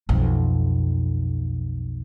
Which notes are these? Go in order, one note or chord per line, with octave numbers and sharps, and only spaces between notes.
B1 F2